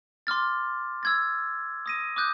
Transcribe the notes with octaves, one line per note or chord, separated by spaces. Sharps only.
C6 D6 F6 A6
E6 G#6 A6
D#6 A#6 D#7
D6 D#6 F#6 G6